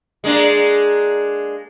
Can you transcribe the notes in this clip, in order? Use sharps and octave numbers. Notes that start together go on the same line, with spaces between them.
G#3 A#3 D4